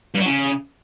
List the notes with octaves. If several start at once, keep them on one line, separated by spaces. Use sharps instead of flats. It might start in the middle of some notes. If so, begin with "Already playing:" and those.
G2
F#3
C#3